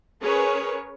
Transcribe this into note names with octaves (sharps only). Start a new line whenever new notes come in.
C#4 G#4 A#4 B4 C#5